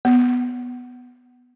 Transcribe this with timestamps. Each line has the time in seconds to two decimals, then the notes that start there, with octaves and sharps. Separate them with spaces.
0.05 B3